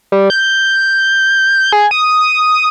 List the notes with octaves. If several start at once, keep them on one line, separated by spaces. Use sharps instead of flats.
G3
G6
G#4
D#6